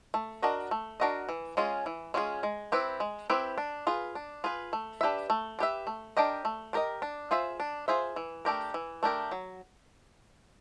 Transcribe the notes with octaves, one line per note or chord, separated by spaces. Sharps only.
A3
D4 F#4 A#4 D#5
A3
D4 F#4 A#4 D#5
E3
G#3 C#4 F4 G#4
E3
G#3 C#4 F4 G#4
G#3
C4 E4 G4 B4
G#3
C4 E4 G4 B4
D4
F4 G#4 B4
D4
F4 G#4 B4
A3
D4 G4 B4 E5
A3
D4 G4 B4 E5
A3
D4 G4 A#4 D#5
A3
D4 G4 A#4 D#5
D4
F4 G#4 C5 E5
D4
F4 G#4 C5 E5
E3
A3 D4 G4 A#4
E3
A3 D4 G4 A#4
F#3